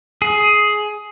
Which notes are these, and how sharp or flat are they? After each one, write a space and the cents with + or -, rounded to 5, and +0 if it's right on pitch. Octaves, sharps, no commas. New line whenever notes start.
G#4 +15